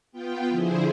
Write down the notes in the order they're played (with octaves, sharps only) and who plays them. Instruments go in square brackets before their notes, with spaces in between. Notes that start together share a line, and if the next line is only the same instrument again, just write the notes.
[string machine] B3 F4 G5
D3 F3 E4 G#4 C5